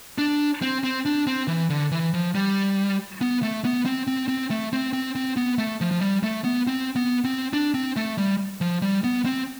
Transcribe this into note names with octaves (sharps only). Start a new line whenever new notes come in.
D4
C4
C4
D4
C4
E3
D3
E3
F3
G3
B3
A3
B3
C4
C4
C4
A3
C4
C4
C4
B3
A3
F3
F3
G3
A3
B3
C4
B3
C4
D4
C4
A3
G3
F3
G3
B3
C4